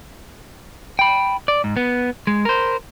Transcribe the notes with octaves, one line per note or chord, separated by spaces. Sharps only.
G5 B5
D5
G#2
B3
G#3
A#4 C5